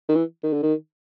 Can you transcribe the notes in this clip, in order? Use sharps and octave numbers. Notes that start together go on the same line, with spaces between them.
D#3
E3
D#3
D3
D#3